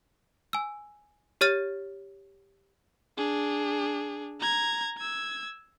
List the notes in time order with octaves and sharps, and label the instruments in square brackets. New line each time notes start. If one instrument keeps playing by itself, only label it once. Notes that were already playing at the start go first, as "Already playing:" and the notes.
[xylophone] G#5 E6
G4 C#5 F6 A6 D#7
[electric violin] D4 G#4
A#5 G#6
E6 G#6